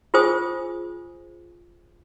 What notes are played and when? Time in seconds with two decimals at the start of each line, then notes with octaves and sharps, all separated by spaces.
0.14 F4 G#4 C5 G#5 D#6